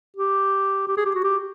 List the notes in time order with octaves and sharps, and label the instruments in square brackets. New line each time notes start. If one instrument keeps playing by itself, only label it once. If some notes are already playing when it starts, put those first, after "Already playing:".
[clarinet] G4
G4
G#4
G4
F#4
G4